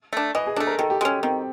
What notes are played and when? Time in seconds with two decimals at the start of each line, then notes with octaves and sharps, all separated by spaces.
0.13 A3 D4
0.35 E3 D#5
0.46 G#4
0.56 D4 A4
0.60 A3
0.67 A#4
0.79 D#3 A4
0.90 G4
1.01 G#3 G4
1.05 C#4
1.23 D#3 C4